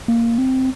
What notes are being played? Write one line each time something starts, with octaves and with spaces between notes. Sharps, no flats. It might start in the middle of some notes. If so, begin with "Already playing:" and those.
A#3
C4